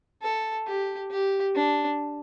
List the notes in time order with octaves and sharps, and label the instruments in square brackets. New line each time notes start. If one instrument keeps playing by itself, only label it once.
[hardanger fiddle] A4
G4
G4
D4